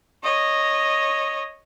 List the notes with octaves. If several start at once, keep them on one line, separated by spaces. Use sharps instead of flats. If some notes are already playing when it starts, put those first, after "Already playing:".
C#5 D#5